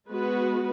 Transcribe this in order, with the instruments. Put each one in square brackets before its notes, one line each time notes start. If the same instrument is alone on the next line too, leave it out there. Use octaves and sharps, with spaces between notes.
[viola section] G#3 B3 F#4 B4